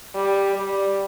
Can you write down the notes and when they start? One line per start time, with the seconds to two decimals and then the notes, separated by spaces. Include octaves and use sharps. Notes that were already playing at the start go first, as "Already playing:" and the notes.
0.14 G3
0.56 G3